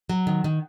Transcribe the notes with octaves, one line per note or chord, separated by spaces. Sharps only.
F#3
D#3
D#3